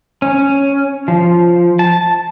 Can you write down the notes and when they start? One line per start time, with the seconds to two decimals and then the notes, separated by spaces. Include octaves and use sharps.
0.22 C#4
1.08 F3
1.79 A5